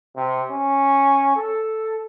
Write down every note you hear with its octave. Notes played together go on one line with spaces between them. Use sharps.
C3
C#4
A4